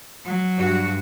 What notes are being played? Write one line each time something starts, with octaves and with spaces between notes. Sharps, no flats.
F#3
G2 F#4